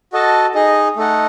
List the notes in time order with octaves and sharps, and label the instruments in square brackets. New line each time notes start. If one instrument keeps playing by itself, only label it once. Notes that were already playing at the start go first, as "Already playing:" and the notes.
[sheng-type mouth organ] F#4 A4 D#5 A5
D#4 G#4 D#5
A3 D#4 A4 D#5 F#5